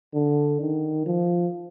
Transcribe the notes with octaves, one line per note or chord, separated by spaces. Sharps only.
D3
D#3
F3